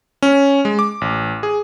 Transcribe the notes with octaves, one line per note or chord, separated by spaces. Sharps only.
C#4
G#3
D6
A1
G#4